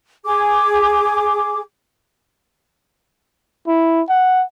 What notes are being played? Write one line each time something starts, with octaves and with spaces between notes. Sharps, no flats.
G#4 D6
E4
F#5